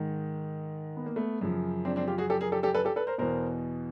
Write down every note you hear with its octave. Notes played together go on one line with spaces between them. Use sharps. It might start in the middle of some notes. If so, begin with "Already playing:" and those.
Already playing: G#2 D#3
B3
A#3
A3 B3
F#2 C#3 F3
C4 D4
C4 D4
F4 G4
F#4 G#4
G4 A4
G#4 A#4
G4 A4
G4 A4
A4 B4
G4 A4
A4 B4
A#4 C5
E2 B2 A#4 C5